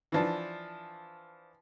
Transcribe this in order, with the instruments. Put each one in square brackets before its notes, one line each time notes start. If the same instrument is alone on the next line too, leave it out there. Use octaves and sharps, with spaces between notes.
[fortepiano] E3 F3 D4